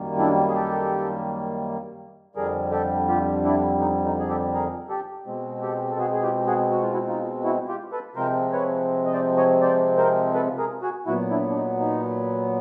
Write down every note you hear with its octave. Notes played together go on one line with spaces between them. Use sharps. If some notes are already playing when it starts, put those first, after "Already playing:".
Already playing: F#2 D#3 G3 A#3
D4 E4
G#4
G4 A4
F2 D3 G3 G#4 A#4
G4 A4
F4 G4
D4 E4
D#4
D#4
G#4
G4 A4
G#4 A#4
G4 A4
B2 G#3 C4
G4 A4
A4
F#4 G#4
G#4
F4 G4
F#4 G#4
F#4
F4
E4 F#4
D#4 F4
E4 F#4
F4 G4
A4 B4
C3 F3 G#3 C4 A#4 C5
B4 C#5
D#5
C5 D5
C#5 D#5
C5 D5
A#4 C5
A4 B4
G#4 A#4
F#4 G#4
A#2 F#3 B3 E4 F#4
D4 E4
D4
D#4
D#4